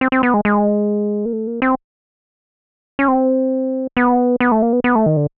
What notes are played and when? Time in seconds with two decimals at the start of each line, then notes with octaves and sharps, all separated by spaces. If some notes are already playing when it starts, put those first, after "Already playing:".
0.01 C4
0.12 C4
0.23 B3
0.34 G#3
0.45 G#3
1.25 A#3
1.33 A3
1.47 A#3
1.62 C4
2.99 C#4
3.08 C4
3.97 B3
4.40 B3
4.52 A3
4.62 A#3
4.73 B3
4.84 B3
4.95 A3
5.06 D#3
5.17 D3